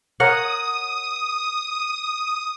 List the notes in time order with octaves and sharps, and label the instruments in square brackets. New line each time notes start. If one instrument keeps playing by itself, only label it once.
[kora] A#4 C#5 F#5 [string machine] D#6